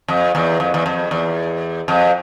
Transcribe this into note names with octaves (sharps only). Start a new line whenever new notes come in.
F2
E2
F2
E2
F2
E2
F2